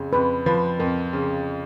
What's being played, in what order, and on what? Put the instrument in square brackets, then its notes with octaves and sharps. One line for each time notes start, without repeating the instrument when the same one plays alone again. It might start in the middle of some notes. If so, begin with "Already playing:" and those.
Already playing: [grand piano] F2 C#3
[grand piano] F2 [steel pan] B4
[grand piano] F3 [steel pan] B4
[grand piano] F2 [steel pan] A#4
[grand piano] C#3